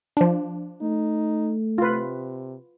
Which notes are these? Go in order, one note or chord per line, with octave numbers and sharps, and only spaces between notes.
F3 D4
A3 D#4
C3 F4 B4